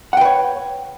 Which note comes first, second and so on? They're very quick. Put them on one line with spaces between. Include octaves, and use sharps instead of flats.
F#5 G5 B4 C#5